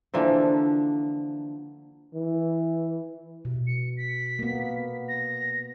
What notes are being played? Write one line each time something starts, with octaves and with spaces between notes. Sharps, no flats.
D3 E3 F3 A#3
E3
B2
C#7
B6
A#3 B3
A#6